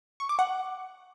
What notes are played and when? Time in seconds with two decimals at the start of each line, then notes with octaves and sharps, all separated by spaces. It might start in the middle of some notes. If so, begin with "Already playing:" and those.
0.20 C#6
0.29 D6
0.39 F#5